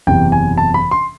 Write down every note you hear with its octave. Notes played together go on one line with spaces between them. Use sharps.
F#1 E2 C3 E3 G5
G#5
A5
B5
C6